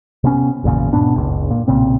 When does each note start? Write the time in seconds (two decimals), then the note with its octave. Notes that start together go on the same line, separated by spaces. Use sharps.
0.24 C3 B3 C#4
0.64 G#1 E2 A#2 C#3
0.93 G#2 B2 B3 D4
1.15 F#1 C#2
1.51 A#2
1.68 B1 A#2 C#3 C4